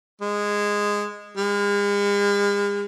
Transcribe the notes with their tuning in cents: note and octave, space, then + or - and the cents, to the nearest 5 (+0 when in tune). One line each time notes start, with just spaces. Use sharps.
G#3 -10
G#3 -45